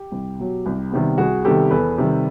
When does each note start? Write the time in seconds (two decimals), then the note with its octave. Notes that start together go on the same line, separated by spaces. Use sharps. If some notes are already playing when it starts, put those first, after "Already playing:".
Already playing: G4
0.12 C2
0.39 B2 F#3
0.66 C2
0.92 C3 D#3 G3 B3
1.18 C2 F#4 G#4
1.45 C3 D#3 G3 B3 G4 A4
1.71 E2 A4 B4
1.98 C3 D#3 G3